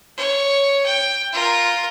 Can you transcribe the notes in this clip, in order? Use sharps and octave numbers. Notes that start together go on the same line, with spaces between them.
C#5
G5
F4 A#4